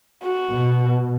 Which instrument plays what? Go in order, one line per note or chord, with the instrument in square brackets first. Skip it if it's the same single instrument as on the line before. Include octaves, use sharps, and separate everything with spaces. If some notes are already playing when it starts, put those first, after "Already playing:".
[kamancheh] F#4
[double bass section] B2